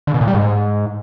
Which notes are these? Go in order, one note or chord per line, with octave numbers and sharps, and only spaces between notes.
D3
B2
A#2
G3
G#2